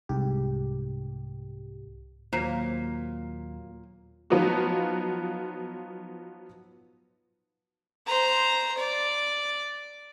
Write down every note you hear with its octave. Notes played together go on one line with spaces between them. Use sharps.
C2 G#2 G4
D#2 A#2 F#3 A#3 C5 A#5
F3 F#3 B3 D#4 F4 F#4
C5 A#5
D5